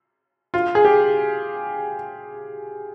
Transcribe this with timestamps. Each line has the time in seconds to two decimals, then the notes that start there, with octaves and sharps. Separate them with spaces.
0.54 F4
0.75 G#4
0.85 G4